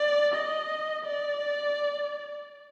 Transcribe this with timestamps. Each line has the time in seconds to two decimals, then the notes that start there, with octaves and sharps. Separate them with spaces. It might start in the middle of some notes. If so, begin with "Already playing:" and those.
Already playing: D5
0.34 D#5
1.05 D5